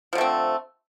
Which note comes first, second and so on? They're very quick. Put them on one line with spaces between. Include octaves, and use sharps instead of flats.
F3 D3 A3 C4